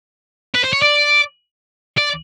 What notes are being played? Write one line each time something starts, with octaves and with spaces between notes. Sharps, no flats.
B4
C5
C#5
D5
D5